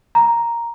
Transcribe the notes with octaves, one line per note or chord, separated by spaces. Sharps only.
A#5